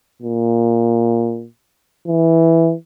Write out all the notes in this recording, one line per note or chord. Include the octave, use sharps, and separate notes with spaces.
A#2
E3